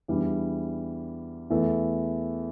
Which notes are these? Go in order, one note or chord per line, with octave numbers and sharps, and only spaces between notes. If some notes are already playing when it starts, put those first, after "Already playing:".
E2 E3 G3 D4 G4
E2 E3 A3